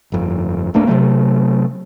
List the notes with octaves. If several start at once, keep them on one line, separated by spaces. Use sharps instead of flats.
G1 F2
D1 A3 A#3 D4
C3 F3 F#3 A3